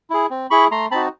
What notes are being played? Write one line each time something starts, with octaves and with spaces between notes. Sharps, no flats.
E4 G#4
C4
E4 G#4 B5 C#6
A3 A#5 C6
C4 D#4 F#4 A5 B5